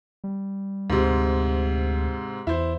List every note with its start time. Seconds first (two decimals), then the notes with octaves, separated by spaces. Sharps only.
0.24 G3
0.90 D2 G#2 C3
2.47 E2 E4 C5